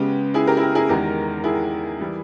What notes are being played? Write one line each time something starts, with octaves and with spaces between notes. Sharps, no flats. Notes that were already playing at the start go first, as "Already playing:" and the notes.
Already playing: C#3 G#3 B3 G4
E4 G#4
G4 A#4
E4
G4
E4 G#4
E2 D#3 G#3 G4 A#4
E4 G#4
E3 G3